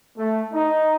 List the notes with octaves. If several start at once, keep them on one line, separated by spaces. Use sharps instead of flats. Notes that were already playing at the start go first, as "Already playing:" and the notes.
A3
D#4